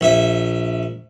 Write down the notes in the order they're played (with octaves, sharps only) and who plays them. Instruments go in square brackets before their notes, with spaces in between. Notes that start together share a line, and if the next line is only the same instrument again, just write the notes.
[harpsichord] A#1 E5